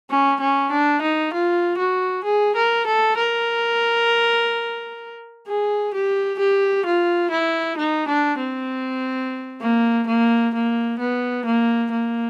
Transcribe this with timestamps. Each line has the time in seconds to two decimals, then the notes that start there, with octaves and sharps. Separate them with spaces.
0.10 C#4
0.40 C#4
0.71 D4
1.02 D#4
1.33 F4
1.78 F#4
2.24 G#4
2.56 A#4
2.87 A4
3.17 A#4
5.47 G#4
5.94 G4
6.39 G4
6.86 F4
7.31 E4
7.77 D#4
8.08 D4
8.38 C4
9.61 A#3
10.07 A#3
10.54 A#3
10.99 B3
11.45 A#3
11.92 A#3